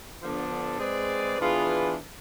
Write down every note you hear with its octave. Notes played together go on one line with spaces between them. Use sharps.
D3 F3 B3 D4 A4
G#3 C4 G#4 B4 D5
E3 B3 D4 F4 G#4